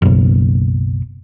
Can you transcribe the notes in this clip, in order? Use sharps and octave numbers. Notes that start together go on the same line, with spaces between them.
F#1 B1